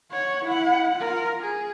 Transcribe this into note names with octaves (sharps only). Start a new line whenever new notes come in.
C#5 F#5
E4 F#5
F4 A#4
G#4